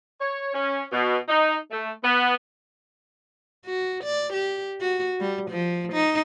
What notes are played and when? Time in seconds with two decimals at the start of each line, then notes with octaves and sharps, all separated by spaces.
0.20 C#5
0.54 C#4
0.92 B2
1.29 D#4
1.72 A3
2.04 B3
3.65 F#4
4.04 D5
4.34 G4
4.81 F#4
5.20 G3
5.51 F3
5.93 D#4